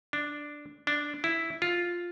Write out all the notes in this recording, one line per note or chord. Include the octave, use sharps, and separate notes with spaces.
D4
D4
E4
F4